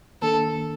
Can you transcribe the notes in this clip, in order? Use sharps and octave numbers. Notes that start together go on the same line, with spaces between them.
D#3 A#3 D4 A4